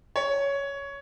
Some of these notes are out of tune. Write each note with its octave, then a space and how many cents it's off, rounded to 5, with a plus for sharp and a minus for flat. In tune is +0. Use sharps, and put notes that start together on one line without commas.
C#5 +10